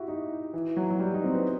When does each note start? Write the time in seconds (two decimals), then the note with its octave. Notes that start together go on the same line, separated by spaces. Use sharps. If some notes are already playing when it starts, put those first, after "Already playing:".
Already playing: E4 F#4 G4
0.08 D#4
0.53 E3
0.77 F#3
0.91 F#3
0.99 G3
1.14 D#4
1.24 C4
1.35 B3